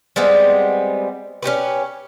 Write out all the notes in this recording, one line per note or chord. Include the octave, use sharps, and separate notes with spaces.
G3 G#3 B3 C4
C#4 D#4 G4 B4